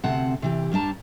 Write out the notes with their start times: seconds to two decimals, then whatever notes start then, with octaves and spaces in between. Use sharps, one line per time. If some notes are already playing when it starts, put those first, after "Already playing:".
0.04 D2 C3 C4 F#5 A5
0.42 C3 E3 G4
0.72 G2 G3 D4 A5 A#5